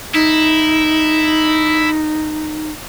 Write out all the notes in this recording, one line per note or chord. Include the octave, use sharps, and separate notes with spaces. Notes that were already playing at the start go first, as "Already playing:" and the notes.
D#4 E4